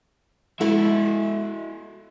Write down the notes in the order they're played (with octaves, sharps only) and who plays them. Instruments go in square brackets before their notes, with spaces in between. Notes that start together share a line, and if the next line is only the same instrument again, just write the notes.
[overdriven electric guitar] G#3 E5 [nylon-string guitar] E4 F#4 A4